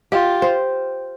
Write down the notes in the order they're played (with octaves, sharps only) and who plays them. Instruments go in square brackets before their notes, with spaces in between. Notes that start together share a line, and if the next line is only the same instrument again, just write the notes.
[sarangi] F4 [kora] G4
[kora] C5